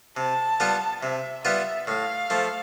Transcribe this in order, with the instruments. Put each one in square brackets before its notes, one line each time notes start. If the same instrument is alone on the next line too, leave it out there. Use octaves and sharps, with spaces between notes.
[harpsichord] C3 [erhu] A5
[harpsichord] G3 B3 F4 B4
[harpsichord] C3 [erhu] E5
[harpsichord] G3 B3 F4 B4 [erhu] E5
[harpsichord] A2 [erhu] F5
[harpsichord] F3 A3